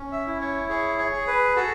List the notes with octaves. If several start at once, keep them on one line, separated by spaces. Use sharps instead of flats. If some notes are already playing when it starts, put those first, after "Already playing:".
Already playing: C#4
E5
E4
C#5
G#4 C#5
C#5
G#4
B4
F#4 A4